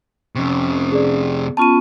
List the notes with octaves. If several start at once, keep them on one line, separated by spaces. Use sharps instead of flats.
F2 C3 C#4
G#4 D5
B3 C#4 F4 A5 C#6 D#7